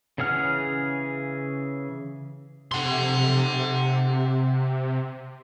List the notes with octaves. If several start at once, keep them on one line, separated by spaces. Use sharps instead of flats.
C#3 E3 G#4 F#5 F6
C3 F#5 C6